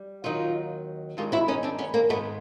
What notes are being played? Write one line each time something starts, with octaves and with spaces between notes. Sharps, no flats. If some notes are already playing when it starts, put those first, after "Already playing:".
Already playing: G3
D#2 D#3 F#3 D#4 F4
G2 D#3 G#3 F4 G4
E4 F#4
C#4 D#4
C4 D4
B3 C#4
A#3 C4
G#2 D#3 G#3 A3 B3